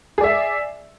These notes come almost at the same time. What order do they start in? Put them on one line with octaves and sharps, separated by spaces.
G#4 D5 E5